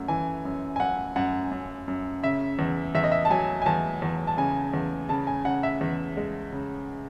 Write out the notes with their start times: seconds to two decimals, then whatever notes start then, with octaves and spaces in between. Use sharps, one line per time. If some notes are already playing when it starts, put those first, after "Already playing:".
Already playing: F#2 A3 F#5
0.08 E3 G#5
0.45 F#2
0.76 G#5
0.80 F#2 F#5
1.16 F#2 F#5
1.51 F#2
1.88 F#2
2.23 C#3 E5
2.59 E2
2.95 E2 E5
3.04 D#5
3.12 E5
3.25 A5
3.30 F#3 G#5
3.62 G#5
3.66 E2 A5
4.02 E2
4.27 A5
4.37 C#3 G#5
4.74 E2
5.09 C#3 A5
5.27 G#5
5.45 C#3 F#5
5.63 E5
5.81 E2
6.17 G#3
6.52 C#3